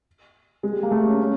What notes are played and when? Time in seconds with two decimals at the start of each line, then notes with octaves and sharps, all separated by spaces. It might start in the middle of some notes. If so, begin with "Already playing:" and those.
0.63 G#3
0.72 G3
0.83 A#3
0.91 A3
1.06 C#4
1.20 C#4